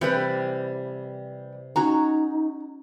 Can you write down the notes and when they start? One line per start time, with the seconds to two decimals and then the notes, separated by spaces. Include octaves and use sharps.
0.01 C3 E3 G3 B4
1.76 C#4 D#4 F#4 C#5 A#5